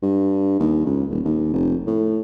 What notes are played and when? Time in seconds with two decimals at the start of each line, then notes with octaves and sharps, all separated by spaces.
0.02 G2
0.59 D#2
0.86 C#2
1.10 D#1
1.25 D#2
1.53 F1
1.87 A2